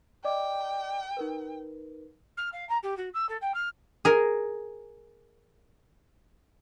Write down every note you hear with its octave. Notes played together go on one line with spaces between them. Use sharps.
D5 D#5 G5 D6
D#4 A#4 B4
F6
F5
A#5
G4
F#4
E6
A4
G5
F6
G#4 A#4